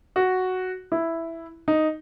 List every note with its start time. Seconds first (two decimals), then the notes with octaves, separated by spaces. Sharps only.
0.16 F#4
0.92 E4
1.68 D#4